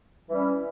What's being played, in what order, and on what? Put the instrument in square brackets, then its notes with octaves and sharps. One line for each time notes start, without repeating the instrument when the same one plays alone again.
[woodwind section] E3 G3 C#4